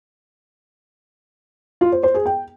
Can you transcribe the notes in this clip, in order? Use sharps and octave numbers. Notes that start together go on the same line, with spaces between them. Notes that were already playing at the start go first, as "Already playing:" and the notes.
F4
C5
C5
G#4
G5